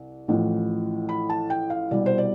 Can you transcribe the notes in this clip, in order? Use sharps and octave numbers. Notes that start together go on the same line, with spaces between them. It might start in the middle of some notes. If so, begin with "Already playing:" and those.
Already playing: C2
A1 A2 F3
B5
A5
G5
F5
C2 B2 G3 D5
C5
D5